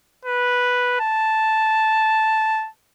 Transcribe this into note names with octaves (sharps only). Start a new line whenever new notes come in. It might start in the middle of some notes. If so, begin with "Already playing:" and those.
B4
A5